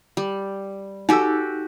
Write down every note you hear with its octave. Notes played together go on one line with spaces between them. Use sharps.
G3
D#4 F#4 G4 A4 E6